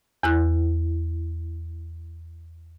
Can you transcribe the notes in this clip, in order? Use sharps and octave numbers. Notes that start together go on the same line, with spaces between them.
E2 E4 F#6